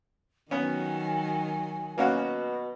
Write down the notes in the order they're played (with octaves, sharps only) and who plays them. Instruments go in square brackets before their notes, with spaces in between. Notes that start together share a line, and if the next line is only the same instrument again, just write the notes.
[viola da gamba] D#3 F#3 [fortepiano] B3 C#4 [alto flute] G#5
[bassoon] B2 [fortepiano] A#3 C#4 F#4